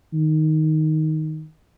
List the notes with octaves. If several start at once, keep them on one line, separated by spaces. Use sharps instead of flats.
D#3